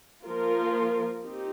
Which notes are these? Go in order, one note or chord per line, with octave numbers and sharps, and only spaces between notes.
F3 A#3 F4 A#4
C4 D#4 G4